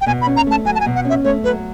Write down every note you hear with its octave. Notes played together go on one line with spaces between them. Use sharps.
G5
B2 G#5
B5
C#4
A#5
A3 A5
F#3 G#5
A5
G#5
B2
F#5
C#4 E5
A3 C#5
F#3 B4